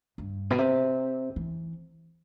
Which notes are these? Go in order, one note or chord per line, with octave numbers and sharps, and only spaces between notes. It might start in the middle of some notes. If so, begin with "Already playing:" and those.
G2
B2
C3
E3